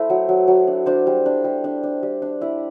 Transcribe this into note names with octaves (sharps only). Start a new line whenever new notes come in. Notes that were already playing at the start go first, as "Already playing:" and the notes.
Already playing: A3 E4 C5
F#3
F#3
F#3
D4
D4 C5
G3
D4
G3
D4
D4
G3
D4
E4 D5